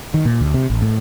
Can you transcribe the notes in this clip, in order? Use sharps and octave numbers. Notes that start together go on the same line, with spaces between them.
D#3
A#2
D2
C3
A1
A2